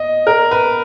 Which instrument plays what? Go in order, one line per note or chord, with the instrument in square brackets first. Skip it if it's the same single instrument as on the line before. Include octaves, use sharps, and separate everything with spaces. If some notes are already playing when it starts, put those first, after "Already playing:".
Already playing: [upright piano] D#5
A#4
B4